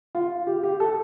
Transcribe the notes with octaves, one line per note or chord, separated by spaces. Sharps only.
F4
G4
G4
A4